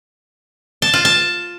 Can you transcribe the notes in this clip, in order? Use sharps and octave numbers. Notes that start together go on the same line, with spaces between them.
A5
F4
A5